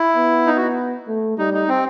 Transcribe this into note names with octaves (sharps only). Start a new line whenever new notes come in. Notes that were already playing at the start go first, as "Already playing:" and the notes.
Already playing: E4
B3
D#4
F#4
A3
G3 D#4
D#4
C4